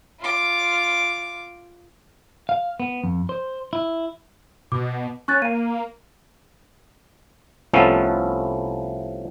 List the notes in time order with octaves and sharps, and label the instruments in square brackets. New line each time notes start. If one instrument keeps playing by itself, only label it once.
[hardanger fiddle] F4 D6
[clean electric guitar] F5
B3
F2
C5
E4
[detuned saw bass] B2 [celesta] D6
[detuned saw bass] C#4 [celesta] C#6 F#6 A6
[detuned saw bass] A#3 [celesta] D#7
[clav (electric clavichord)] C2 F3 A3 B3 C#4 A4